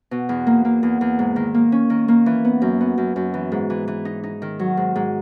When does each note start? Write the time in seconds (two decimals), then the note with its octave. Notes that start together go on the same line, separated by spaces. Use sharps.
0.11 B2
0.29 E2
0.47 A#3
0.65 A#3
0.83 E2
1.01 E2
1.19 G#2
1.36 D#3
1.54 A#3
1.72 C#4
1.90 D#3
2.08 A#3
2.26 E3
2.45 B3
2.62 F#2
2.81 B3
2.98 F#2
3.16 F#2
3.34 E3
3.52 G#2
3.70 E3
3.88 E3
4.05 D#4
4.24 D#4
4.42 D#3
4.59 F#3
4.77 G#2
4.96 G#2